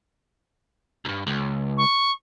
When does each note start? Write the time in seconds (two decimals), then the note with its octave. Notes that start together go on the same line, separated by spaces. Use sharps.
1.05 C2 G2
1.27 C#2
1.78 C#6